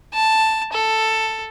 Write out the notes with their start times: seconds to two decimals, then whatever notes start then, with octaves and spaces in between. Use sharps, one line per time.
0.14 A5
0.73 A4